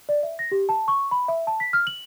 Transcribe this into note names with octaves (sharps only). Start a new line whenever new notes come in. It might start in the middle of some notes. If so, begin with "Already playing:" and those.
D5
E5
A#6
G4
A5
C#6
B5
E5
A5
B6
F6
F#7